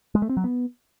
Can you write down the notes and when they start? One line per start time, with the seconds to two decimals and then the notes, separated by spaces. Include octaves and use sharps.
0.15 G#3
0.22 A3
0.29 C4
0.37 F#3
0.44 B3